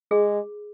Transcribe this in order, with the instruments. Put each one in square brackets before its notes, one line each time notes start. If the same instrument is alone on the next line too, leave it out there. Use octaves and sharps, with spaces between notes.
[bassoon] G#3 [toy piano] G#4